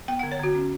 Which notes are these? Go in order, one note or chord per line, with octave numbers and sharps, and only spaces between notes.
B3 G5
F#5
D3
C#5
D3 F#4
C#4